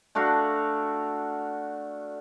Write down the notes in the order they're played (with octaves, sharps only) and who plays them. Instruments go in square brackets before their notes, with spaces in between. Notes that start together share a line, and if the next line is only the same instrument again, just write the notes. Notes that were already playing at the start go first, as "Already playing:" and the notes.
[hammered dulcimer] A3 D4 F#4 F5